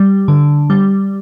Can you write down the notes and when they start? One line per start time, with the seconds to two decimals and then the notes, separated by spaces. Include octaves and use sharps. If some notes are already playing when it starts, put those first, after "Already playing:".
Already playing: G3
0.28 D3
0.70 G3